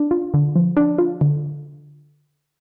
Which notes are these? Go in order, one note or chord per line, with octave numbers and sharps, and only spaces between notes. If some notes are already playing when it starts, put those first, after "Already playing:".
Already playing: D4
F4
D3
F3
D4
F4
D3